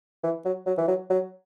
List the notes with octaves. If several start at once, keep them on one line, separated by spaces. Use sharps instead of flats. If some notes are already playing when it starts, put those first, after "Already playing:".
E3
F#3
F#3
E3
F#3
F#3